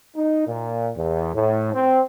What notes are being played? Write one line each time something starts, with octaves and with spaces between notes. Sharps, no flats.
D#4
A#2
E2
A2
C4